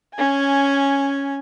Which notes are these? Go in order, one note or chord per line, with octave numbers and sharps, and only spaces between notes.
C#4 G#5